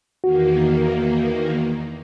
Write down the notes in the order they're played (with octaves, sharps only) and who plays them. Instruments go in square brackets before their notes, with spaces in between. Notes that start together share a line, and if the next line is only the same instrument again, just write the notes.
[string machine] E2 D#3 A#3 [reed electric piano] F#4